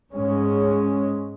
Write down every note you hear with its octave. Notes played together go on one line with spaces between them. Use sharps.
G#2 G#3 C#4